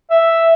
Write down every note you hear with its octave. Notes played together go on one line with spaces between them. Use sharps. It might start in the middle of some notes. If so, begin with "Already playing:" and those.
E5